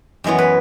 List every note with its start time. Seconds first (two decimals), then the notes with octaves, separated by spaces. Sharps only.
0.24 F#2 E3 G#3 B3 C#5
0.38 B4